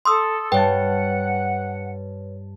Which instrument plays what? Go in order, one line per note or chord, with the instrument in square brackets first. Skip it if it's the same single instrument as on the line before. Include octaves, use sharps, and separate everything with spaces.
[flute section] A4 [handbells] C6 D#6 E6
[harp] G2 A5 [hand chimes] B4 C#5 [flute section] F#5 [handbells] G5